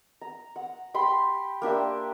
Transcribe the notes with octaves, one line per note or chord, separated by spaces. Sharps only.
A#5
F#5
G4 B5 C6
A#3 D4 G4 E5